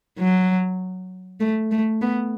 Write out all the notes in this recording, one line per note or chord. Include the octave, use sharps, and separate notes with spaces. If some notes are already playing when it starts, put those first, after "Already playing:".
F#3
A3
A3
B3